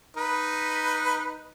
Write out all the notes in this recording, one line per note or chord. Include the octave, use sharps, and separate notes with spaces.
D#4 B4